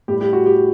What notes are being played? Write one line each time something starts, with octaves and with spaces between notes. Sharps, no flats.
A2 G3 G4
G4
F#4
G4